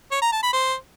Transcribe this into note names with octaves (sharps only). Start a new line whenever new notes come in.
C#5
A#5
A5
B5
C5